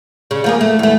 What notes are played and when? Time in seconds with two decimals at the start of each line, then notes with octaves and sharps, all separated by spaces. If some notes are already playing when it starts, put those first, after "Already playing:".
0.31 C#3
0.44 F3 A#3 G#4
0.61 A3
0.79 E2 A3